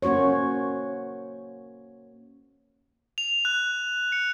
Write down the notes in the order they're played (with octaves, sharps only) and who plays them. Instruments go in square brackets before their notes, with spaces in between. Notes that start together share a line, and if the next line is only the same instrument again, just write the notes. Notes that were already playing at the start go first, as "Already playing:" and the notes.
[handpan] A#3 C#4 F#4 C5 C#5
[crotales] F7
F#6
C#7